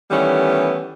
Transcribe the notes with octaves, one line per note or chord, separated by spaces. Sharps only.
D#3 E3 G3 A3 B3 C#4